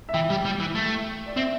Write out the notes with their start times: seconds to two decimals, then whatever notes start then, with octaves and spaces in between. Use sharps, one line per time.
0.09 E5
0.14 E3 G5
0.30 G3
0.45 G3
0.60 E3
0.75 A3
1.26 D5
1.36 C4 E5